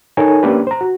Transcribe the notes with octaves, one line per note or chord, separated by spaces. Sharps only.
D#4 A4 A#4 C#5 G#5
A#3 C#4 D4 G4 B4
C5 A#5
F#4